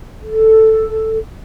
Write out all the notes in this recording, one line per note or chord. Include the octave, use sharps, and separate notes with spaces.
A4